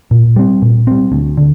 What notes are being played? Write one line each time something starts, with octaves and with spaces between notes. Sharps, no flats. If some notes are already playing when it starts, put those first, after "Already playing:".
A#2
G3 C4
A#2
G3 C4
D2
D3